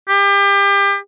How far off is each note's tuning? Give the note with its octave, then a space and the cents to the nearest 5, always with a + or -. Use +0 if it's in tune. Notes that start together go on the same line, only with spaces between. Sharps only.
G4 +30